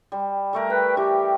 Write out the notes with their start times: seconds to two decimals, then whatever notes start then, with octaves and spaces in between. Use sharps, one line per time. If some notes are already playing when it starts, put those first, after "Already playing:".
0.12 G3
0.53 G3 A3 A#4
0.70 B4 G5
0.97 E3 G4